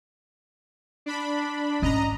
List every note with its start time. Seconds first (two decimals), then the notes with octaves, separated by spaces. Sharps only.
1.06 D4 B5
1.82 G#1 C#4 D#5 A#5